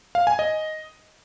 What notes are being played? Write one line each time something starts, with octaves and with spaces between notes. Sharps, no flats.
F5
G#5
D#5